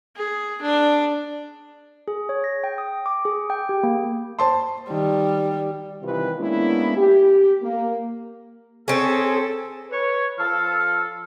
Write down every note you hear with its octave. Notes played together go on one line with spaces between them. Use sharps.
G#4
D4
G#4
C#5
A#6
G5
D#6
D6
G#4
G5
G4
A#3
C5 A5 C6
D#3 G3
C3 D#3 E3 G3 F4 B4
G#3 A#3 B3 C#4 D4 E4
G4
A#3
C4 C#4 G#4 A4
B4 C#5
F3 A4 F5